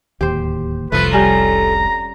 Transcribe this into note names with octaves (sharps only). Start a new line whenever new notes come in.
D1 D#2 G4 C5
F1 C2 F3 A3 B4
G3 C#4 A#5